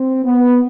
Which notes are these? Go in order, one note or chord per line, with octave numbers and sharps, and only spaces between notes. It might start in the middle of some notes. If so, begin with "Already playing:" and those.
Already playing: C4
B3